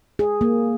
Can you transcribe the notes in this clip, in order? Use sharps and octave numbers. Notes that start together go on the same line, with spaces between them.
G#4
A#3